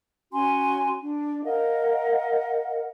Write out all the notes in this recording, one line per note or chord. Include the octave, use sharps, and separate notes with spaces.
C#4 F#4 G#5 C6
D4
A#4 D#5 F5 F#5